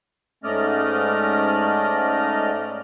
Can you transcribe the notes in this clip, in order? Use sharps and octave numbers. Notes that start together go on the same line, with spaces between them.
G#2 A3 C#4 D5 D#5 F6